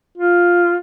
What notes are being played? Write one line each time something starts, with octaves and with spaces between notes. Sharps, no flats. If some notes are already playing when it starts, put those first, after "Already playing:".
F4